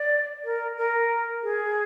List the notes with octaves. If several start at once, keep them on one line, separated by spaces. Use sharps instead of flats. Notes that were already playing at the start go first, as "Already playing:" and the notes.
Already playing: D5
A#4
A#4
G#4